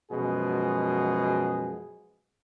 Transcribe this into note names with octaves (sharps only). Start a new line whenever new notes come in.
F#2 B2 F3 G#3 B3 G#4